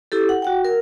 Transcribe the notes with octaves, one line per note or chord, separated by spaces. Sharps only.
E4 G4 A4
F#5
F#4 F#5 G5
A#4